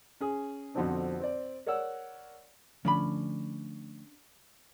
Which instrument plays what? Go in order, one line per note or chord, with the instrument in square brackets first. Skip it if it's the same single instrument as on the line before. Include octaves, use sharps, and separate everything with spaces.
[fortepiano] C#4 G#4
F2 B2 D3 F3 C4 D4
C4 D5
A#4 C#5 D5 F#5 E6
[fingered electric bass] D3 F3 A3 [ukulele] C#4 D4 B5